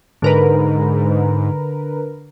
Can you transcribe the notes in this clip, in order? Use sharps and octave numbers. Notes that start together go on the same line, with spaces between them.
G#2 D3 A#4 B4